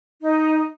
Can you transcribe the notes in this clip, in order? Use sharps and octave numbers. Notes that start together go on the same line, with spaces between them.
D#4